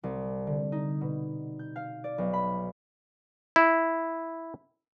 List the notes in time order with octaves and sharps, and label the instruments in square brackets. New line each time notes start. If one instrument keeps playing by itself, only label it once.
[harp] C2
D3
D#4
B2
G6
F5
D5
B1
B5
[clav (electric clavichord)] E4